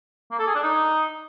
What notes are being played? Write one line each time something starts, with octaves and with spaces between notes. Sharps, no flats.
A#3
A4
G#4
D4
D#4